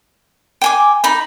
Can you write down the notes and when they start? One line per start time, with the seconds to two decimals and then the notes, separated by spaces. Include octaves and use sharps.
0.61 G5 G#5 D6
1.04 D#4 B5